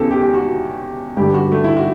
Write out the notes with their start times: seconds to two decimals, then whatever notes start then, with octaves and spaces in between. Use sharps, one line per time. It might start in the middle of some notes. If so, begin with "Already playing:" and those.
Already playing: E2 C#3 E3 G4 A4
0.11 G4
0.22 G4
0.34 F#4
1.17 G2 D3 G4
1.34 F#4
1.52 A3
1.64 E4
1.77 F#4